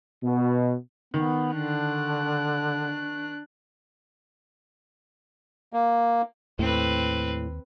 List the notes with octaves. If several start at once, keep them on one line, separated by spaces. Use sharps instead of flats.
B2
D#3 B3
D3 D4 F#6
A#3
D#2 A2 C4 B4